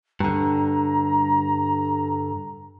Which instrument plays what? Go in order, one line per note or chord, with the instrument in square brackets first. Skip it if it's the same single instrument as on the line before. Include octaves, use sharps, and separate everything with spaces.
[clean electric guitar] G2 D3 [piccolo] A#5